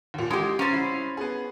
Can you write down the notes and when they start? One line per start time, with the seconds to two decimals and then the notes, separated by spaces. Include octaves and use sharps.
0.14 D#2 A#2
0.31 A1 G#3 G4
0.59 C#3 C#4 C5 A#5 A6
0.72 C2 E4 B5
1.17 B3 G#4